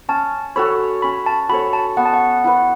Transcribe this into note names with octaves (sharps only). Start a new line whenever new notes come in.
C#4 A5
F#4 A4 C#5 B5
C#4 B5
A5
F#4 A4 C#5 B5
A5
B3 F#5
A5
F#5
E4 B4 F#5